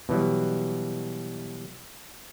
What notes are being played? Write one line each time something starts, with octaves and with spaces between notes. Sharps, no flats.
B2 E3 F#3 G3